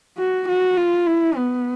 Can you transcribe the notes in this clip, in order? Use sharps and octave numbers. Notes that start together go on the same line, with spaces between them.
F#4
F#4
F4
E4
B3